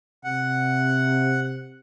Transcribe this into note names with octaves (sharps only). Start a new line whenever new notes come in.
C3 F#5